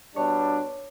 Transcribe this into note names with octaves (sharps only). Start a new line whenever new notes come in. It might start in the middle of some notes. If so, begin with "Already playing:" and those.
B2 G3 D4 C#5